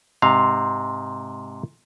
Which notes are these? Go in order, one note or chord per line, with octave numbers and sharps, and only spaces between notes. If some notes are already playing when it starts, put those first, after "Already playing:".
G#2 C3 F5